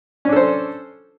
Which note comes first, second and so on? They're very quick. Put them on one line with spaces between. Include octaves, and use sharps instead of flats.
C#4 D4 A4 C5